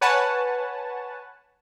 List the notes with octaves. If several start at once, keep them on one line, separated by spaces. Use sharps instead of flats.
B4 C#5 F#5 G#5 A5